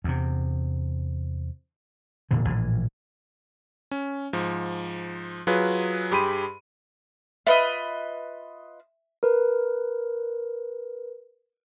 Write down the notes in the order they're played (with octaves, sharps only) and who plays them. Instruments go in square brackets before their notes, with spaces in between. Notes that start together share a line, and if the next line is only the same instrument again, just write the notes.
[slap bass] E2 C3
E1 A#2 D3 E3
A#1 A2 E3
[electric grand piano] C#4
G#2 F3
F#3 F4 G#4 B4
G2 G4 G#4 B5 C6 D#7
[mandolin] F4 B4 D#5 [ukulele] E5
[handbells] A#4 B4